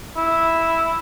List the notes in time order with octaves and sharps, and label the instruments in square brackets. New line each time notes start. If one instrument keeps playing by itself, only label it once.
[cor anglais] E4